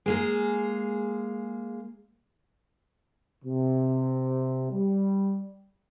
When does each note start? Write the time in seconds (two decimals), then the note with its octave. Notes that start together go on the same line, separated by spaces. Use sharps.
0.06 G#3 A#3 G#4
3.45 C3
4.71 G3